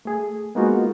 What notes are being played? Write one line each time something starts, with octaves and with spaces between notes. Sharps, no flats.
A3 G#4
G#3 A#3 B3 D#4 F4 F#4